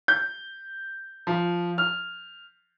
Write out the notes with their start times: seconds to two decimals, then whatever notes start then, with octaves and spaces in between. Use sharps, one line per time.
0.08 G6
1.27 F3
1.78 F6